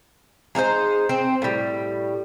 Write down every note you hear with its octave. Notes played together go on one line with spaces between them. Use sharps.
G#3 D#4 E4 C5
C4
A2 G3